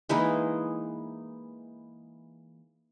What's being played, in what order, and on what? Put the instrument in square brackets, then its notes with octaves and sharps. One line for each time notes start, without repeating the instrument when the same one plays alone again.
[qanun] E3 G#3 A#3 D#4